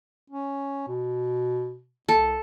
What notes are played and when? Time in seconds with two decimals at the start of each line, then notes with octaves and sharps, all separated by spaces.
0.30 C#4
0.88 B2
2.09 C2 A4